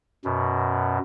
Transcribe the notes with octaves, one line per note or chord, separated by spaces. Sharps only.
F#2 B2